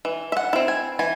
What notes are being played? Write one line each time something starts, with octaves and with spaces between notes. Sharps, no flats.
E3
E5
F#5
C4 E4
G#5
E3 G#5